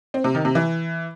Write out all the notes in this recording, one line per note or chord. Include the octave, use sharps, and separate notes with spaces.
C4
C3
D#3
C3
E3